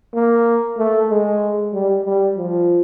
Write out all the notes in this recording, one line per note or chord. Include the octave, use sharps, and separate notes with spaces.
A#3
A3
G#3
G3
G3
F3